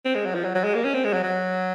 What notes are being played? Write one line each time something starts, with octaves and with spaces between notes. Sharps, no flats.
C4
G#3
F#3
F3
F#3
F#3
G#3
A#3
C#4
C4
G#3
F#3
F#3